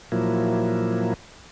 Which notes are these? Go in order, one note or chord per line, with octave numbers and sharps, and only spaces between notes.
A#2 F3 F#3 A#3 E4